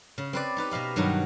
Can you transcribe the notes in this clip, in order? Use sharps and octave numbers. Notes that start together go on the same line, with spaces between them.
C#3
C4 B4 D5
D#4 G4 B4
B2 D#5 F5 B5
G2 D#3 F#3 D#4 F#4